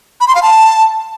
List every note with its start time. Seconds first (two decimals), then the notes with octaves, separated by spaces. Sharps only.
0.20 B5
0.28 C6
0.35 F5
0.42 A5